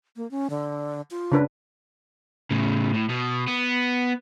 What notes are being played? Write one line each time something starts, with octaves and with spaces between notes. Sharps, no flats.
A#3
C#4
D3
F4
C#3 D4 B4
A2 C#3
A2
B2
B3